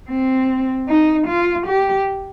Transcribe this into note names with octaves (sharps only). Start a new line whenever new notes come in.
C4
D#4
F4
G4